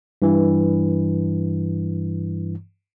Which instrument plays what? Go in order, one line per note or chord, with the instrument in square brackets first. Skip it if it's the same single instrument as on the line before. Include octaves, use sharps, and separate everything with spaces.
[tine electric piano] G2 E3